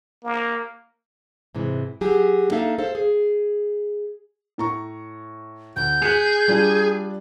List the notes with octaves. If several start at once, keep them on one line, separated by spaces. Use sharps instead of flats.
A#3
G#2 C3 E3
F#3 G4 G#4
A#3 D4 D#4 A4 E5 F5
A4 C5 F5
G#4
A2 A#5 C#6
D2 G6
G#4 F#6 B6 C#7
G3 D4 F4